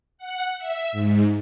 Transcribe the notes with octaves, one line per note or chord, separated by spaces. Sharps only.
F#5
E5
G#2